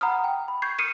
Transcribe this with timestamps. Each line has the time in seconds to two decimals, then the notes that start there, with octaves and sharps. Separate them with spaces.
0.01 F#5 A#5 B5 D#6 F6
0.24 G5
0.48 B5
0.62 C#6 G6 G#6 C7
0.79 D#6 F6 C7 C#7 D#7 E7